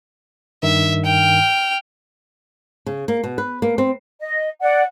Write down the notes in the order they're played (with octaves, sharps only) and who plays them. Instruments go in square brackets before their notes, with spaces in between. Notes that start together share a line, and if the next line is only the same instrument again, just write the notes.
[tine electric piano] G2 D#3 [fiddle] E5
[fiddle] G5 F6
[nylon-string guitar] C#3
A#3
B2
B4
A#3
C4
[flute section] D#5
D5 F#5